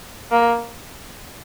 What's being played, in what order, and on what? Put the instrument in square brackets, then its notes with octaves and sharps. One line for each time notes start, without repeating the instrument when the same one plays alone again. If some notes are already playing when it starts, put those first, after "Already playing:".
[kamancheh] A#3